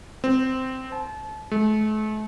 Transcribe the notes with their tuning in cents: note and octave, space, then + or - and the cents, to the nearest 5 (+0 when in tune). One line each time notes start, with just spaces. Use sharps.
C4 -10
A5 -30
A3 -40